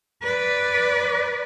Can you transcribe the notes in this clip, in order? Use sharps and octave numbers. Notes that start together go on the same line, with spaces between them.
B4 D5